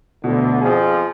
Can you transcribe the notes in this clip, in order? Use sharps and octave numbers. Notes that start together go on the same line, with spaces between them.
D2 B2 D3
F2 F3 G#4